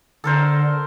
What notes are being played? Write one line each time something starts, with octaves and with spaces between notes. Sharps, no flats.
D3 A4 A#4 C5